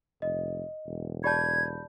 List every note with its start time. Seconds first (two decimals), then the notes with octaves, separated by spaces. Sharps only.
0.22 F1 D#5
0.87 E1
1.24 G4 D5 A5 B5 G6 G#6